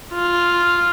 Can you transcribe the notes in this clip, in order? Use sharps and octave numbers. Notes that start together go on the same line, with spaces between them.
F4